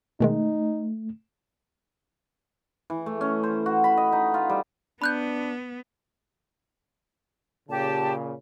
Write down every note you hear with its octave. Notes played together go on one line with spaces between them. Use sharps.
B2 D#3 G#3 A3 D#4
E3
A3
C#4
C5
F#4
B5
D#5
D#4
F4
G3
B3 D4 B5 F#6 G6
A#2 C#3 G4 A5